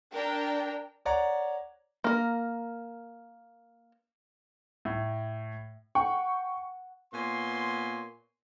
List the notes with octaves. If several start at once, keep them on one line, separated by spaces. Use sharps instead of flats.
D4 A#4 G5
C#5 D5 F#5 A#5
A#3 A#4
A2
F#5 G5 C#6
A#2 B3 C#5 G#5 C6